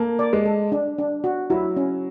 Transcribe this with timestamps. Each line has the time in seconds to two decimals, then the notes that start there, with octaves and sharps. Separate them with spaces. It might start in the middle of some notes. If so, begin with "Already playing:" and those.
Already playing: A#3 A4
0.19 D5
0.33 G#3
0.45 A4
0.72 D4
0.98 D4
1.24 F#4
1.50 F#3 E4
1.77 C#4